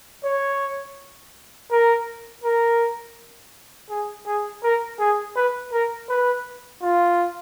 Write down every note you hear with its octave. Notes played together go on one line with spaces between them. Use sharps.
C#5
A#4
A#4
G#4
G#4
A#4
G#4
B4
A#4
B4
F4